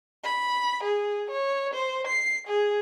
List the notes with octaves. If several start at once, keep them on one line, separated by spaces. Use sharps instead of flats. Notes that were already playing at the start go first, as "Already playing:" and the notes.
B5
G#4
C#5
C5
C7
G#4